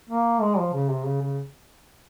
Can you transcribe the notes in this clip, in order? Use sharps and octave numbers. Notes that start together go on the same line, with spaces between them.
A#3
G#3
F3
C#3
C3
C#3
C#3